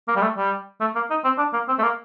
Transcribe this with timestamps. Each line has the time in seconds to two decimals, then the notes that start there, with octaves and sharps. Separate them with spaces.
0.08 A#3
0.16 G3
0.22 A3
0.37 G3
0.81 A3
0.95 A#3
1.10 D#4
1.24 C4
1.38 D4
1.53 A#3
1.68 C4
1.79 A3
1.83 A#3